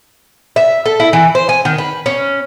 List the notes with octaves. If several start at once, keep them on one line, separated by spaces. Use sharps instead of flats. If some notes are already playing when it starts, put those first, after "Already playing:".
E5
A4
E4
E3
C5
G#5
D#3
B4
C#4